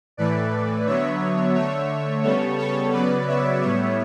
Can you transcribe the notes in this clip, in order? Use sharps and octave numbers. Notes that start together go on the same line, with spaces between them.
A2 E3 A3 B4 D5
D3 F#3 B3 C#5 E5
D3 A3 C#5 E5
C#3 G3 B3 A4 C#5
A4 C#5
C#3 F#3 B3 B4 D5
C#5 E5
A2 G3 B3 C#5 E5